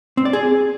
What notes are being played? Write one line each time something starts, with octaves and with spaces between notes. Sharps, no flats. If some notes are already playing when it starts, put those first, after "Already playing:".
C4
D5
G#4